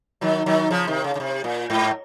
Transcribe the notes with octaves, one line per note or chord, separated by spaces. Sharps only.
D#3 F#3
D#3 F#3
C#3 F3
C3 D#3
C#3
C#3
C3
A#2
G#2